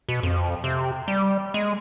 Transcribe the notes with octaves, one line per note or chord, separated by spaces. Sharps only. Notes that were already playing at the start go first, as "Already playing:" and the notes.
B2
F2
C3
G3
G#3